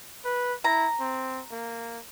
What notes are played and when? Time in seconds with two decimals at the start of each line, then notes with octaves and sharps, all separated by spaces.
0.25 B4
0.64 E4 A#5
1.00 C4
1.51 A#3